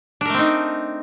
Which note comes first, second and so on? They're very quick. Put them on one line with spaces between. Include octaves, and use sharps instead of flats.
D4 A#4 A3 C4 D#4